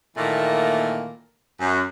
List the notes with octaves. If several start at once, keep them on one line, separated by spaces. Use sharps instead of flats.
A#2 D#3 E3 A3 A#3
F#2